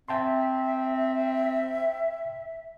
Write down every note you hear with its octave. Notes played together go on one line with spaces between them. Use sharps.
C4 E5 G5 A5 C6